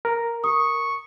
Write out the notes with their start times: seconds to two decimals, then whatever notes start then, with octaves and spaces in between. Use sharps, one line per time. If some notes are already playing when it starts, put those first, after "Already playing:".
0.05 A#4
0.44 C#6 D#6